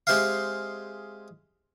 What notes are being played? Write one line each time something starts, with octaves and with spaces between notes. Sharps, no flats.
G#3 C4 G4 C5 E5 F5